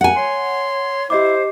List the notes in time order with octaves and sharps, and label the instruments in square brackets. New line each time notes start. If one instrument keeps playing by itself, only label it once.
[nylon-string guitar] F#5 G#5
[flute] C#5 [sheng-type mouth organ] C6
[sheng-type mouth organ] E4 [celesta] G4 D#5 D6 [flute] C5